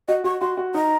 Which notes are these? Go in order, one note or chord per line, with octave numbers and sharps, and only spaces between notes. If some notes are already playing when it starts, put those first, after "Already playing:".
F#4 D#5
F#4 C#6
F#4 C6
F#4
D#4 A#5